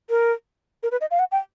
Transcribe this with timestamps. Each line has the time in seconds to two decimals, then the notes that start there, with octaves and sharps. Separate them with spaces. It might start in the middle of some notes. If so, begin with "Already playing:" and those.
0.10 A#4
0.83 A#4
0.92 B4
1.01 D#5
1.11 F5
1.19 F#5
1.32 G5